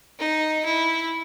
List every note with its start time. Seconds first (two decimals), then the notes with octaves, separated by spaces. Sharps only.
0.19 D#4
0.65 E4